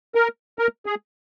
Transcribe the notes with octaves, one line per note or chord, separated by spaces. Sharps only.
A#4
A#4
G#4